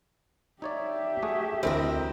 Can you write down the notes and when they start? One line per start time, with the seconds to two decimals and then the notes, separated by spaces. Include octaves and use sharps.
0.62 D#4 G4 C#5 D5 E5
1.22 A3 F#4 G#4
1.63 D2 E3 C4 A#4 D#5